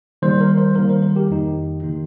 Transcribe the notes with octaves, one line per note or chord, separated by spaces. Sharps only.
D#3 G3 A#3 C5
A#4
C5
D#3 G3 A#3 A#4
C5
A#4
G4
F2 D#3 A#3 D#4
D#3 A#3 D#4